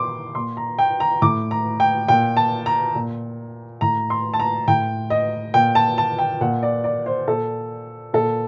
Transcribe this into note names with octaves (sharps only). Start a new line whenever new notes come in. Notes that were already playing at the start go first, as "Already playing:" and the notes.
Already playing: A#2 C6 D6
A#2 C6
A#5
G5
A#5
A2 D6
A#5
G5
A#2 G5
A5
A#5
A#2
A2 A#5
C6
A5
A#5
A2 G5
D#5
A#2 G5
A5
A5
G5
A#2 F#5
D5
D5
C5
A#2 A4
A#2 A4